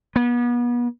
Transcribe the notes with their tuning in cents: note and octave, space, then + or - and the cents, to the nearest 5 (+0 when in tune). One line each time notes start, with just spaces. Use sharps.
B3 -35